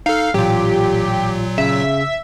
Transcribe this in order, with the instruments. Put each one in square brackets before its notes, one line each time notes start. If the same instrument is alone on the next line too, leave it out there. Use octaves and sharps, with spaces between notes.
[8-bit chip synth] D#4 A4 [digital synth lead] F5
[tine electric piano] A1 F4 [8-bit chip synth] A#2 F#3 [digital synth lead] G4
[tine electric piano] C#3 [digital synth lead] E5